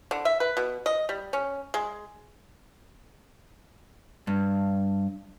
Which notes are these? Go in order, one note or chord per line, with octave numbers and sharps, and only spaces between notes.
D3
E5
B4
B2
D#5
G3
C#4
G#3
G2